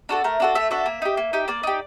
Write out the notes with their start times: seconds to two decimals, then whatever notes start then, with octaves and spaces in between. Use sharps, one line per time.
0.09 D4 F#4 A4 A#4
0.24 A3 A#4
0.40 D4 F#4 A4
0.55 A3 E5
0.71 D4 F#4 A4 E5
0.86 A#3
1.02 D#4 G4
1.17 A#3
1.33 D#4 G4
1.48 A#3 D5
1.63 D#4 G4